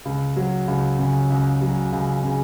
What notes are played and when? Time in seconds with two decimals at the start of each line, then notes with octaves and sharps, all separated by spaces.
0.05 C#2
0.36 F#3
0.68 C#2
0.99 C#3
1.30 C#2
1.61 F#3
1.92 C#2
2.23 C#3